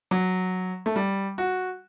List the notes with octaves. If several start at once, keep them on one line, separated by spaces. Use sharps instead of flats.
F#3
A3
G3
F#4